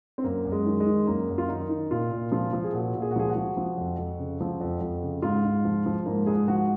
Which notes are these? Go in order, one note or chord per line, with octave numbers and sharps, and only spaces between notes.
C4
F#2 A#3
F#2
G#3
D#3
G#3
D#3
F#2 A#3
F#2
F4
D#3 D#4
D#3
A#2 F4
A#2
F3 F4
F3
G#4
A#2 F#4
A#2
G#4
F#4
F3 G#4
F#4
F3
F3
F2
F2
C#3
F3
F2
F2
C#3
G#2 F4
G#2
F3
F3
G#2 A#3
G#2 G#4
F3 F#4